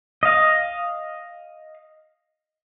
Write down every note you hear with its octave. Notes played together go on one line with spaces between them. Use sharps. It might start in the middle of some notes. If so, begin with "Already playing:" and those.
D#5 F5